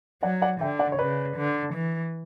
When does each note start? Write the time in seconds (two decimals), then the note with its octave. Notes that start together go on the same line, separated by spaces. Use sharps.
0.23 F#3 D5 F#5
0.42 D5 F#5
0.61 D3 E5 G5
0.79 D5 F#5
0.92 C#5
0.98 C#3 B4 D5
1.37 D3
1.74 E3